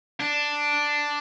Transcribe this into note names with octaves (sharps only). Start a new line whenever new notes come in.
D4